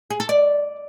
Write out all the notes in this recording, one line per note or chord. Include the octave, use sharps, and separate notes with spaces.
G#4
A4
D5